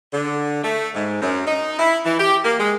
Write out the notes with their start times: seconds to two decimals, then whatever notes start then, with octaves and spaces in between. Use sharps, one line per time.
0.13 D3
0.63 A3
0.94 G#2
1.21 F#2
1.46 D#4
1.79 E4
2.05 E3
2.19 G4
2.44 A#3
2.59 G#3